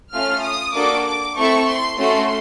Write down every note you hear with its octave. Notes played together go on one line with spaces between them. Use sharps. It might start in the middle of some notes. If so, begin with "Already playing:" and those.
A3 C#4 F4 F6
D#6
A#3 D4 F#4 A4 D6
D6
A3 C4 E4 A4 C#6
C6
A3 C#4 F#4 A4 C6